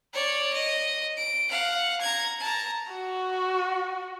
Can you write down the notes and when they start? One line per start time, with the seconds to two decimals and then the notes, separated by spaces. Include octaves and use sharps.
0.13 C#5 D5
0.54 D#5
1.17 D7
1.51 F5 F#5
2.01 A#5 G#6
2.40 A5 A#5
2.93 F#4